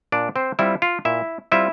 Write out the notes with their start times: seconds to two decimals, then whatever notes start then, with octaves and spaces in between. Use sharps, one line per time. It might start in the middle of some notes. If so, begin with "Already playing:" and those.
0.12 A#2 D4 D5
0.36 C4 C5
0.59 G3 C4 E4 F4 E5
0.82 F4 F5
1.05 A#2 E4 E5
1.52 G3 C4 E4 F4 E5